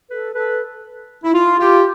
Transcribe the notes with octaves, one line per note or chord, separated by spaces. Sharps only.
A4 B4
A4 B4
E4
F4
F4 G4